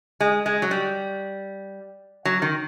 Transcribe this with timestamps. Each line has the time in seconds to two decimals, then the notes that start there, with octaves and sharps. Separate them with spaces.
0.20 G#3
0.46 G#3
0.62 F#3
0.71 G3
2.25 F#3
2.42 D#3